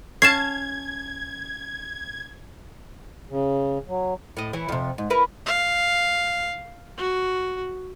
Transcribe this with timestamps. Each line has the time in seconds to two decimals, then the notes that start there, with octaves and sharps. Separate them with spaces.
0.22 C#4 F5 A5 G#6 C7 E7
3.30 C#3
3.88 F#3
4.37 A2 D#5
4.53 E3 E4 C#5
4.69 F2 C3
4.98 G#2
5.10 E4 A#4 B4
5.46 F5
6.98 F#4